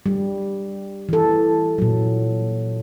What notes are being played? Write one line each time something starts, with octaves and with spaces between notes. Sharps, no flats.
G3
E3 A4
A#2 F#3